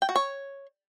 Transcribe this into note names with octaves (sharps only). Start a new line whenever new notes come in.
G5
F#4
C#5